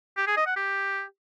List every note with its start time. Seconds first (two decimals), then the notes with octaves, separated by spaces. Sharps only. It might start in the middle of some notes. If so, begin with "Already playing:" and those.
0.17 G4
0.27 G#4
0.37 D#5
0.46 F#5
0.56 G4